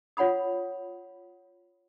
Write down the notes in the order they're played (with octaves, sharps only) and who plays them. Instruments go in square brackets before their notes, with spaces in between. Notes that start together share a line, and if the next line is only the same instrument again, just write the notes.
[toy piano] F4 C#5 F#5 B5 D#6